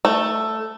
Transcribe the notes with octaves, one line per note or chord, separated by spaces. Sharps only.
A3